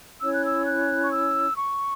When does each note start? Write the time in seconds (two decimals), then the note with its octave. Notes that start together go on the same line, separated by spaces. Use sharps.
0.20 C#4 E4 C#5 E6
0.32 F#6
0.44 E6
0.65 F#6
1.04 C#6
1.11 E6
1.56 C#6